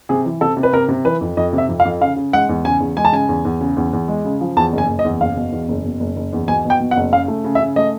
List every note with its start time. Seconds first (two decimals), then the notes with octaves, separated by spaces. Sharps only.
0.09 C3 G#4
0.25 E3
0.41 C3 A4
0.57 C3
0.63 B4
0.73 C3 A#4
0.89 C3
1.05 E3 B4
1.21 F2
1.37 F2 D#5
1.53 C3
1.58 E5
1.69 F2
1.80 F5
1.85 F2
2.01 C#3 F5
2.16 C#3
2.33 G#3 F#5
2.49 E2
2.65 C#3 G#5
2.80 E2
2.97 G#3 G#5
3.05 A5
3.13 C#3 G#5
3.29 E2
3.45 E2
3.61 C#3
3.77 E2
3.93 E2
4.08 G#3
4.25 C#3
4.41 F3
4.57 E2 A5
4.73 F#1
4.78 G#5
4.89 F#1
4.99 D#5
5.05 E2
5.21 F#1 F5
5.37 B2
5.52 E2
5.68 F#1
5.84 B2
6.00 F#1
6.16 F#1
6.33 E2
6.48 B2 G#5
6.65 B2
6.70 G5
6.80 B2
6.91 F#5
6.97 F#1
7.12 C#3 F5
7.28 A3
7.44 C#3
7.55 E5
7.60 C#3
7.76 A3 D#5